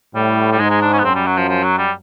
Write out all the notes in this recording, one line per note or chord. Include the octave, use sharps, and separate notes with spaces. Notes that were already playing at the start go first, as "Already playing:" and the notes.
A2 G3
G3
G#2 G#3
G#3
D4
C#4
B3
F#2 C4
G3
F#3
F3
F3
F#3
G3